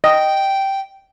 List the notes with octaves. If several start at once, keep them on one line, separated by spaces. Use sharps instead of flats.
D#5 G5